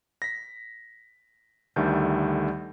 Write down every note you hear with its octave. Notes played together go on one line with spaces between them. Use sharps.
A#6 B6
D2 D3 D#3 G3 A3 G6